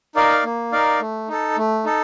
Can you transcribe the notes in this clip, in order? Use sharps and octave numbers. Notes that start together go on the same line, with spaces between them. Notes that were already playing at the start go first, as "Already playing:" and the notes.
D#4 A#4 D5 F5
A#3
D#4 A#4 D5 F5
A3
D#4 A4
A3
D#4 A4